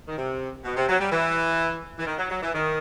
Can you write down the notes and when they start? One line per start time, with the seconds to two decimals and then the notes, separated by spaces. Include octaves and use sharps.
0.08 D#3
0.18 C3
0.64 B2
0.77 C3
0.89 F#3
1.00 G3
1.12 E3
1.99 E3
2.06 D#3
2.18 F#3
2.29 F#3
2.42 E3
2.54 D#3